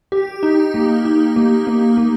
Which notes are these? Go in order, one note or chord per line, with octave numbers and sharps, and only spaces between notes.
G4
D#4
A#3
D#4
A#3
A#3
A#3